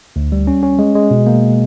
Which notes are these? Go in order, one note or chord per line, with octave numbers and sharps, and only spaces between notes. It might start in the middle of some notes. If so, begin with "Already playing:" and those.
D2
G3
C#4
C#4
G#3
G#3
B2
A#3